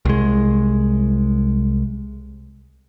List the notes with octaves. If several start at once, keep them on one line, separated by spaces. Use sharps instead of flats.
C2 G#3